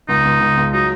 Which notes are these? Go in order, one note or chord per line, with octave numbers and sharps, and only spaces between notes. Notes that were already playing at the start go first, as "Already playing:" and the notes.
C#2 D#4
C#2
C#2
C#2
F#3 D#4